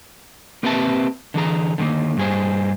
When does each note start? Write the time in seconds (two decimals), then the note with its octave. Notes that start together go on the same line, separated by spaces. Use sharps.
0.63 A#3 C4 G4 B4 E5 A5
1.34 D3 E3 G#4 A#5
1.78 D3 D#3 G#3 A#3
2.17 G2 G#4 C5